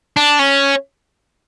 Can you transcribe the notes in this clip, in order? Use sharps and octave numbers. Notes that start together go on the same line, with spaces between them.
D4
C#4